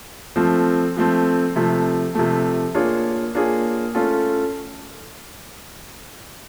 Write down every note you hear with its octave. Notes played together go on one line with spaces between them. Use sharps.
F3 A3 C4
F3 A3 C4
C3 F3 A3
C3 F3 A3
A#3 D4 F4 G#4 C#5
A#3 D4 F4 G#4 C#5
A3 C#4 F4 A4